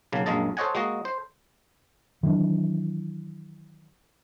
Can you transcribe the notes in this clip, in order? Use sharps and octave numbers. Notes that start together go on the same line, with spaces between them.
B1 C#3 A#3
A#1 F#2 G#3 A#3 D#5 A5
A4 C5 C#5 D#5 F#5 G#5
G#3 A#3 F#4 D#5
C5
D#3 E3 F#3 D4